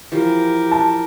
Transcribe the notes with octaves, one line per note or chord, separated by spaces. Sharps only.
E3 F3 G4 A#4
A5